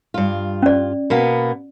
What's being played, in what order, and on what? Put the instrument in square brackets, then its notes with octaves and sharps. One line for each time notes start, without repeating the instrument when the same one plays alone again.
[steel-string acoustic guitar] G2 F4
[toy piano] C#4 D5
[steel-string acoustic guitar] B2 A#3 B3